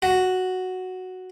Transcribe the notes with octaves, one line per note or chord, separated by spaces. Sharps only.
F#4